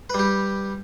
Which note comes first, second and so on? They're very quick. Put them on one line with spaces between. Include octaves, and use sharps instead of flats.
B4 G3 G4